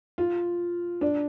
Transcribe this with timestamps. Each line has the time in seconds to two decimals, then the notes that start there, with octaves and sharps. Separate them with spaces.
0.18 F4
1.01 D4